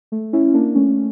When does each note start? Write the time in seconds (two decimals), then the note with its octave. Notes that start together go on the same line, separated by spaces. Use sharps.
0.12 A3
0.33 C#4 E4
0.54 A#3 D4
0.75 A3 C#4